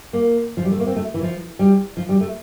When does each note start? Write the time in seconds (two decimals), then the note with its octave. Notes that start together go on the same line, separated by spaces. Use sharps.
0.13 A#3
0.57 F3
0.65 G3
0.72 A3
0.80 A#3
0.86 C4
0.96 A3
1.14 E3
1.23 F3
1.59 G3
1.97 F3
2.09 G3
2.21 A3